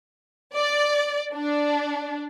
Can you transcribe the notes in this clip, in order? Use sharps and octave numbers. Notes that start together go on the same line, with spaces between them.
D5
D4